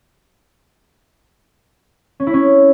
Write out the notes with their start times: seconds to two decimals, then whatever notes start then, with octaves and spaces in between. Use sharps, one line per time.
2.20 C#4
2.27 E4
2.34 C#4